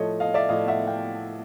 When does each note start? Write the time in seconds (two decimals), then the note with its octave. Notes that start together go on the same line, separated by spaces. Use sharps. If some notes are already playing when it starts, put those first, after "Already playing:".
Already playing: A2 F3 A3 C#5 D#5
0.20 D#5 F5
0.34 D5 E5
0.49 A2 F3 A3 D#5 F5
0.68 E5 F#5
0.87 F5 G5